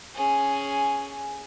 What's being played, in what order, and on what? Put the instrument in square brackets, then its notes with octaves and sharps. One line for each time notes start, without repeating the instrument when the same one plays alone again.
[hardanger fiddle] C#4 G#4